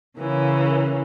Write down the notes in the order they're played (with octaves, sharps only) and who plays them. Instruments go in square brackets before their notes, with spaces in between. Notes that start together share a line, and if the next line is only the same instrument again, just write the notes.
[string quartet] C#3 E3 A#3 C#4